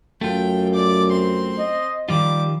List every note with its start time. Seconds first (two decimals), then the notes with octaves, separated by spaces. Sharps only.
0.21 F#2 A3 F4 G5
0.73 D5 D6
1.09 C4 C6
1.59 D#5
2.09 D#3 F3 G3 F4 D6